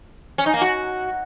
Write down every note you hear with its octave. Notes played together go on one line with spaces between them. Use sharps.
C#4
D#4
A#3
F#4